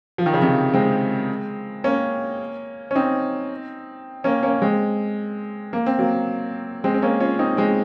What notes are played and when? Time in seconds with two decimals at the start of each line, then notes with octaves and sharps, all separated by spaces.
0.18 F3
0.26 D#3
0.33 C#3
0.42 C3 D#3
0.74 G#3 C4
1.84 A#3 C#4
2.91 C#4
2.95 C4 D#4
4.24 A#3 C#4
4.43 A#3 C#4
4.62 G#3 C4
5.73 A#3
5.86 C4
5.99 F#3 A#3
6.84 G#3 C4
6.94 C4
7.02 A#3 C#4
7.20 C#4 F4
7.39 C4 D#4
7.57 G#3 C4